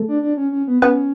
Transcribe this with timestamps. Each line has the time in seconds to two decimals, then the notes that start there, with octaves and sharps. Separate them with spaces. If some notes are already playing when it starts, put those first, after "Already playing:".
Already playing: A3 A4
0.08 D4
0.22 D4
0.37 C#4
0.52 C#4
0.67 B3
0.82 B3 C#4 B4